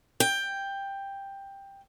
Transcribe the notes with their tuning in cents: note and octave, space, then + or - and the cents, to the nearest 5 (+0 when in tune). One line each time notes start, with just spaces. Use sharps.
G5 +10